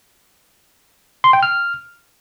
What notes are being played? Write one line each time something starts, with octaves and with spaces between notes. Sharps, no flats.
C6
G5
F6